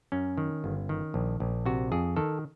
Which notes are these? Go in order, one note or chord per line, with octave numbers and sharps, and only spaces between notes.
F#2 C#4
D#3
G1
D#3
A#1
A#1
C3 F#4
F2 G#4
D#3 A4